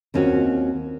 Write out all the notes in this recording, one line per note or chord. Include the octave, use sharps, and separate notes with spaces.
D#2 C4 C#4 F4 F#4